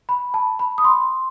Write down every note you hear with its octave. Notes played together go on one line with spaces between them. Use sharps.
B5
A5
B5
D#6
C6